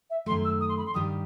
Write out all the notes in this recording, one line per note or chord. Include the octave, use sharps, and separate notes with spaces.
E5
F#2 D#3 A3 C6
E6
D#6
C6
B5
C6
G2 D#3 G3 D#6